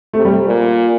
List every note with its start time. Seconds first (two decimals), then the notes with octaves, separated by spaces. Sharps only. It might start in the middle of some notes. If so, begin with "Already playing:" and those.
0.13 C3 A3
0.25 G3
0.46 A#2